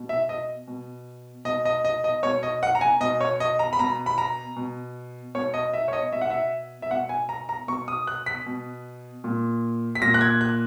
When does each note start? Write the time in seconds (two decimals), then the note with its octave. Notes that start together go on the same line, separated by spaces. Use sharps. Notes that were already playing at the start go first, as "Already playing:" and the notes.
Already playing: B2
0.09 E5
0.29 D#5
0.68 B2
1.45 B2 D#5
1.65 D#5
1.85 D#5
2.04 D#5
2.23 B2 C#5
2.43 D#5
2.63 F#5
2.75 A#5
2.81 G#5
3.01 B2 D#5
3.21 C#5
3.40 D#5
3.59 A#5
3.73 B5
3.79 B2 A#5
4.06 B5
4.18 A#5
4.56 B2
5.35 B2 C#5
5.54 D#5
5.74 E5
5.88 C#5
5.93 D#5
6.13 B2 E5
6.21 F#5
6.30 E5
6.82 E5
6.90 B2 F#5
7.09 G#5
7.29 A#5
7.49 A#5
7.68 B2 C#6
7.88 D#6
8.07 F#6
8.26 B6
8.46 B2
9.24 A#2
9.95 B6
10.02 A#2 A#6
10.14 F#6
10.21 G#6
10.41 F#6